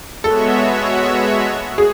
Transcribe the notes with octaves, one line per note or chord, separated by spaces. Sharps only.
G#3 B3 F#4 A4 C#5 E5
G#4